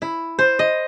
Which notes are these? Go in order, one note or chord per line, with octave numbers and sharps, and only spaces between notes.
E4
C5
D#5